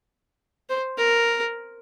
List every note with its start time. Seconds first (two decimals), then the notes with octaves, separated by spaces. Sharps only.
0.69 C5
0.98 A#4